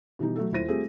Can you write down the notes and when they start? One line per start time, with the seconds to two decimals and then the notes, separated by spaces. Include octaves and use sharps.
0.19 B2 E3 G3 D#4
0.36 F#3 A3 F#4 A4
0.52 D#1 E4 F4 C5 A#6 D#7
0.68 G3 A3 C4 F4 G#4 A4